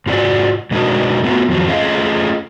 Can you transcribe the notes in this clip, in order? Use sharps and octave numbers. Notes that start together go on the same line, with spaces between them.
G#2 F4 F#4 D5
B2 G#3 D4 D#4 F#4 A#4
A3 B3 F4 F#4
F2 D#3 F3 F#3
A3 C#4 F4 G#4 D#5 F5